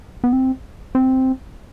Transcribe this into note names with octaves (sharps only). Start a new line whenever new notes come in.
B3
C4
C4